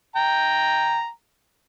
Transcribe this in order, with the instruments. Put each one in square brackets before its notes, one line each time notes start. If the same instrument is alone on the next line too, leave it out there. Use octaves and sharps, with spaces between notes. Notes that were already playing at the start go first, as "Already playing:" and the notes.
[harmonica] G5 A#5